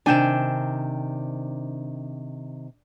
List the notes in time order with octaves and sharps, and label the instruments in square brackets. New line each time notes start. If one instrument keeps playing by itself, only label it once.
[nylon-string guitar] C3 D#3 G#5 [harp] D4 G5 E7